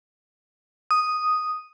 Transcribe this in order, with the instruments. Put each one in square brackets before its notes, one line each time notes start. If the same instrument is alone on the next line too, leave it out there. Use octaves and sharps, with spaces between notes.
[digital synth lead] D#6